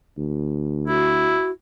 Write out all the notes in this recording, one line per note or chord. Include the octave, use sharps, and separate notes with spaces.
D2
E4 F#4